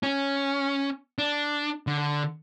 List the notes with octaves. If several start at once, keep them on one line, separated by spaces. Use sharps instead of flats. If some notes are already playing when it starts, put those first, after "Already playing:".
C#4
D4
D3